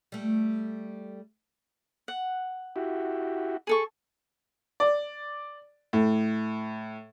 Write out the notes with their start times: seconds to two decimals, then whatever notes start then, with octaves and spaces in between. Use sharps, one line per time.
0.12 G3 A3
2.08 F#5
2.76 E4 F#4 G4
3.67 G#4 A4 C#6
4.80 D5
5.93 A2